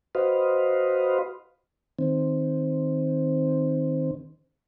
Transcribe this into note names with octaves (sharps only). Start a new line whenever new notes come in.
F#4 B4 C5 D#5 F5
D#3 C4